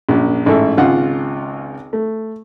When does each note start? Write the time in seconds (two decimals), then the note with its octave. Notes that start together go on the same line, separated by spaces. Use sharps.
0.09 A#1 F#2
0.46 A1 G#2 A4 E5
0.77 G#1 C#2 F4 F#5
1.93 A3